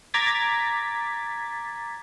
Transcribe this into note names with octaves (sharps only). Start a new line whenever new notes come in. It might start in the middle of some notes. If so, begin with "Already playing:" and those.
A#5 D6 G#6 A6 B6